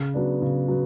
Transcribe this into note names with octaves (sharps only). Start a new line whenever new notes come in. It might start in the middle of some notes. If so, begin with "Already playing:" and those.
Already playing: C#3
F#3 B3 D4
C#3
F#3 B3